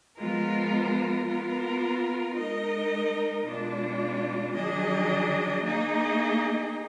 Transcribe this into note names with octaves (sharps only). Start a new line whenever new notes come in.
F3 G#3 B3 F4 A#4
B3 F4 A#4
G#3 D#4 A#4 D#5
B2 G#3 D4 F4
D#3 F#3 D4 G#4 D#5
A#3 D#4 G#4 D#5